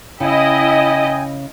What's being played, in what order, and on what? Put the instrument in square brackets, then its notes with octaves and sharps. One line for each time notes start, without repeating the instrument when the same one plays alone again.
[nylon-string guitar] C#3 [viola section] E4 D#5 [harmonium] G5 G#5